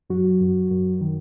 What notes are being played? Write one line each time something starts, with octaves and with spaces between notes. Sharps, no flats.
F#2 F#3 F#4
F#2
F#2
D#3